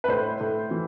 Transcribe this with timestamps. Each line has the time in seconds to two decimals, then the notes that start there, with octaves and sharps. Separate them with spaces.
0.04 B4
0.08 A2 C5
0.40 A2
0.71 E3